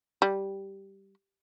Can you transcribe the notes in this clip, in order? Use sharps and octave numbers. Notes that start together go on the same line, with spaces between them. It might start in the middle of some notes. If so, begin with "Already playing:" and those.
G3